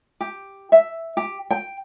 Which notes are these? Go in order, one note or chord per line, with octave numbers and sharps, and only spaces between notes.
G4
E5
G4
G5